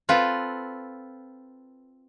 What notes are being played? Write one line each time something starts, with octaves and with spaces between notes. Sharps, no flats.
C4 F4 A4 B4